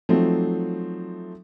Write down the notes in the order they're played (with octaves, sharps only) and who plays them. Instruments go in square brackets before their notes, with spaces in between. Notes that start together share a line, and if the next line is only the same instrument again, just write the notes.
[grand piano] F3 F#3 A3 C4 D#4